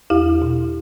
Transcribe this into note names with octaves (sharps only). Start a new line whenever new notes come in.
E2 E4 G4
B2